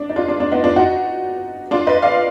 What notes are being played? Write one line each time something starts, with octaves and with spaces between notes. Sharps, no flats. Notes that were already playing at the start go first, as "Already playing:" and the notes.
Already playing: D4
D#4
D4 F4
D4
D4
B3 D#4
D4 F4
D#4 F#4
D4 F4
B4 D#5
D5 F5